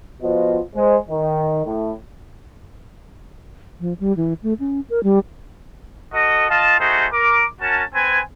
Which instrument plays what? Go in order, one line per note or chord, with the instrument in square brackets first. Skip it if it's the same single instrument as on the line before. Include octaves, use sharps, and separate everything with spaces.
[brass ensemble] F3 B3 F4 F#4 C5 D#5
G#3 C5
D#3
A2
[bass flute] F3
G3
E3
A3
C#4
A#4
G3
[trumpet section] F#4 A4 D#5
F4 D#5 F5 A5
A3 D#4 F#4 G#4 C5
A#4 D6
C#4 F#4 A#4 A5
C4 B4 G#5